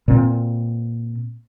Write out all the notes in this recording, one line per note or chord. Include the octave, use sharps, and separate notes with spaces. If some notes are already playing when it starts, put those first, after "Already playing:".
A#2 C4